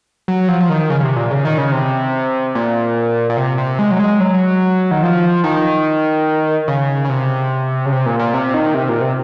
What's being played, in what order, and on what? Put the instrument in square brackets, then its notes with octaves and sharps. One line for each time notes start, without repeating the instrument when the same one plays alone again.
[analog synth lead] F#3
F3
F3
D#3
C#3
C3
A#2
C#3
D#3
C#3
C3
A#2
A#2
C3
C3
G#3
F#3
G#3
F#3
D#3
F3
D#3
C#3
C#3
C3
C#3
C3
A#2
A#2
C3
D#3
C3
A#2
C3